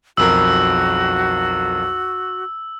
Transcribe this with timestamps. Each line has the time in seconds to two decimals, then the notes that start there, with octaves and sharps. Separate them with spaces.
0.17 B1 F2 F#4 A#4 E6